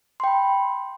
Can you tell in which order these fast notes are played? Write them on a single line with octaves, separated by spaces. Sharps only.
C6 G5 B5